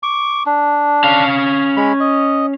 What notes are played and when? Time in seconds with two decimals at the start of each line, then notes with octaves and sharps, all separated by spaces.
0.03 C#6 D6
0.46 D4
1.04 C#4 F5
1.77 G#3 B5
2.00 D#5